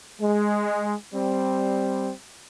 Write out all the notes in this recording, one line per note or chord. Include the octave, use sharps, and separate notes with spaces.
G#3
G3 C4